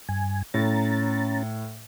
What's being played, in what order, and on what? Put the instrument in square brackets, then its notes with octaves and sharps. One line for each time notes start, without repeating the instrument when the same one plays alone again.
[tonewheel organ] G2 G#5
[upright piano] A2 [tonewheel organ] C#4 A#5 A6